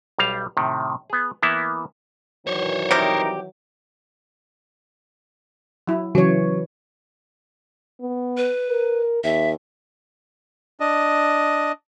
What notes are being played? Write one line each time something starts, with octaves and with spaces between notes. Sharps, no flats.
B1 G3 F5
A2 C3 D#3
B3 G#4
E3 A#3 B3 E4
D#3 E3 F#3 C5 C#5
C3 G3 D#4 G4 A#4
F#3 E4
C#3 E3 F#3 C#5
B3
B4
A#4
D#2 E5
D4 D#5